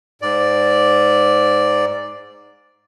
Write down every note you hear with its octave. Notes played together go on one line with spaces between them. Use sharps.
G#2 D5